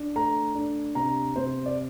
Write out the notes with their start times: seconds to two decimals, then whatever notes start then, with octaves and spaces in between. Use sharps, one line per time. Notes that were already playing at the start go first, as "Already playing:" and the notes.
Already playing: D4
0.16 A3 A#5
0.55 D4
0.95 C3 A#5
1.36 C3 C5
1.66 D5